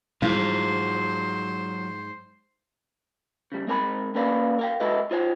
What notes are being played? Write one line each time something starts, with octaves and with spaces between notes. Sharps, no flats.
G#2 F#3 G3 E4 F4 C5
C#3 G3
G#3 C4 A#4 A5 B5
A#3 C#4 A#4 B4 D5 F5
A#4 F5 G5
G#3 E4 F#4 A4 B4 D#5
F4 C5 C#5 G#5